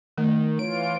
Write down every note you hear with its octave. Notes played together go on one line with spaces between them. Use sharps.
D#3 A3
E3 F4 C#5 D7